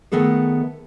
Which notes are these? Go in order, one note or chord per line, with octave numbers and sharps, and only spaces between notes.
D#3 A3 B3 G#4 A4